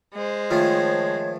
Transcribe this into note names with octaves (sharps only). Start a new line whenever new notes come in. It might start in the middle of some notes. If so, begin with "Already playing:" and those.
G#3 C5
D#3 F3 A3 F4 C#5